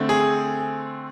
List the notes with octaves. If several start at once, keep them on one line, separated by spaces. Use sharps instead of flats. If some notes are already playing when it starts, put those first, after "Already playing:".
Already playing: D3 A3 C4
G#4